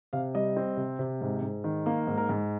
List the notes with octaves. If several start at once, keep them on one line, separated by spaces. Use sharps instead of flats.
C3 F5
G3 D#5
C4
C3
C3
G#2
G#2
D#3
A#3 F5
G#2
A#4
G#2